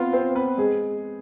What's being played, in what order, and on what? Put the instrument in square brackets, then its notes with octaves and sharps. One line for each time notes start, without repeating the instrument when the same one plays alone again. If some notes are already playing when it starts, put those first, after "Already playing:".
Already playing: [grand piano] B3 C4 B4 [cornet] F4
[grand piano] C4 C5
B3 B4
G#3 G#4